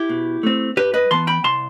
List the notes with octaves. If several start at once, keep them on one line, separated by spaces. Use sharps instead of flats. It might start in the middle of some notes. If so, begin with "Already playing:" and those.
Already playing: E4 G4
B2
A3 C4
G2 G4 B4
B4 D#5
E3 B3 A5 C6
G5 B5
C2 A5 C6